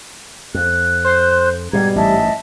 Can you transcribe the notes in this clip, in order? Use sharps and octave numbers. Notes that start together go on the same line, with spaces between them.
F2 F#6
C5
G#2 B2 G3 A#5 G#6
A1 G#2 D#5 E5 A5